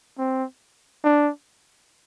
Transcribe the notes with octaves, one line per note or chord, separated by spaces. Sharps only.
C4
D4